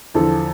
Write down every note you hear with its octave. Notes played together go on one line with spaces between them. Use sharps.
E2 D3 F3 A4